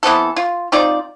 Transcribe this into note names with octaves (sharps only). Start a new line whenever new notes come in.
E3 B3 C4 A4
F4
C4 D#4 F4 D5